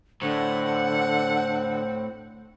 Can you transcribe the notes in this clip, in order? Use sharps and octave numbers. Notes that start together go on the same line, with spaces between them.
A2 D3 C4 F#5